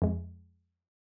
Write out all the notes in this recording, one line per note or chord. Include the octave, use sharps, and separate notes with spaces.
F2 G#3